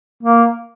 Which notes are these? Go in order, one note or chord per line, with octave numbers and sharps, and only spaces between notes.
A#3